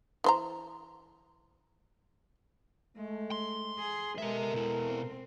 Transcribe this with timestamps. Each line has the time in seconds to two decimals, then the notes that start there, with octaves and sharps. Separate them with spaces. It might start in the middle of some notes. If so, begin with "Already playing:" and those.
0.24 E3 C5 A#5
2.97 G#3 A3
3.31 C6
3.78 G#4
4.18 G#3 B3 G4 A4 A#4 E5
4.54 B2 E4
4.84 C4